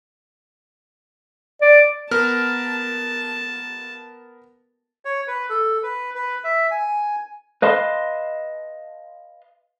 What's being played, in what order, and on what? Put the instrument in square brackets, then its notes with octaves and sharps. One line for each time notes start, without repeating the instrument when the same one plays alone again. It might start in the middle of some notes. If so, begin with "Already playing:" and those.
[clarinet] D5
[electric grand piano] B3 A#4 F6 [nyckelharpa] A5
[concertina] C#5
B4
A4
B4
B4
E5
G#5
[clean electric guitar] B4 D#5 F5 A5 C6